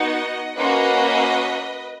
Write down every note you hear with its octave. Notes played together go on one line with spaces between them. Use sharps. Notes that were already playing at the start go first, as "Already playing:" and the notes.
Already playing: B3 D#4 F#4 D#5 F#5
A#3 C#4 F#4 B4 D#5